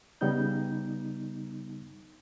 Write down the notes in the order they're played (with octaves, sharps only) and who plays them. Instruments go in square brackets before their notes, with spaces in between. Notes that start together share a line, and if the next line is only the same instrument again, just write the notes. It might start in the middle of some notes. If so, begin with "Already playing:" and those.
[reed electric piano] C#3 G3 B3 D#4 G6